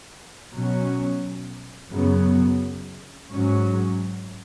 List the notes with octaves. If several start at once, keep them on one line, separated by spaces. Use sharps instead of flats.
B2 F#3 C#4
F#2 C#3 F#3 B3
G#2 F#3 C#4